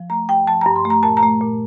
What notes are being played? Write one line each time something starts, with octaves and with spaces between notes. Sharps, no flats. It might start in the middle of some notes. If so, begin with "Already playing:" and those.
Already playing: F3
A3 A#5
G2 G5
F3 A5
G2 A#5
C6
A3
A#5
A#2 A5
A#5
A3
A#2